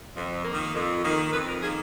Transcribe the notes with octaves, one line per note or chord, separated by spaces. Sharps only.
F2
A#3
D#3
F2
D#3 A#3
F2 B4
A#4
D#3 A#3 G#4